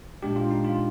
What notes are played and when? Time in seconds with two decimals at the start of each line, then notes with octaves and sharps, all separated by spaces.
0.23 A#2 G#3 D4 G4
0.36 F4
0.51 D#4
0.64 F4